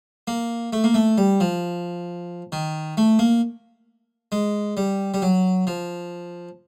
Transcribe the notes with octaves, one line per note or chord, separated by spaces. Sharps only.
A#3
A3
A#3
A3
G3
F3
D#3
A3
A#3
G#3
G3
G3
F#3
F3